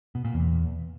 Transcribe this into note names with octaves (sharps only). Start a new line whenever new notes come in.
B2
A#2
E2